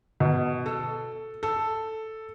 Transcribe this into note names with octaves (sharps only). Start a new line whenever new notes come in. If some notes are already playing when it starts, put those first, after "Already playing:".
B2
A4
A4